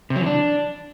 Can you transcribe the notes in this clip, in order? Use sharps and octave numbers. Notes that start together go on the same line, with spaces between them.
C3
F#3
E3
D4